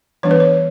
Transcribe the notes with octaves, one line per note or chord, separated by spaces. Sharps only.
E3 G3 B3 D4 C#5
B4
C#5